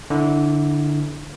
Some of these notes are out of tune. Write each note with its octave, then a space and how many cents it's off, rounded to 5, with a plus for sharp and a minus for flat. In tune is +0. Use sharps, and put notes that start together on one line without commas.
D3 +0 E4 -25